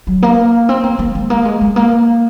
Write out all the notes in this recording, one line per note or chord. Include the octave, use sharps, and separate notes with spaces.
F#3
A#3
C4
A#3
A#3
G#3
A#3
G#3
G#3
A#3